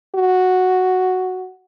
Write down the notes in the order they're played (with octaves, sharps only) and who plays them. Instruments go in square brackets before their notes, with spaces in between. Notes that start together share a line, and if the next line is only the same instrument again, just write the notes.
[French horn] F#4